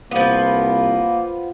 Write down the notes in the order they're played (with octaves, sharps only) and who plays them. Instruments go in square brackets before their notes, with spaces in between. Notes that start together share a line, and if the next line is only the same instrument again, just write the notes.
[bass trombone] C2 [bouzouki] F3 B3 [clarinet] A#3